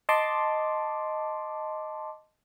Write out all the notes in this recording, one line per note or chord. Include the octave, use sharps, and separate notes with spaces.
D#5 A5 C6 D6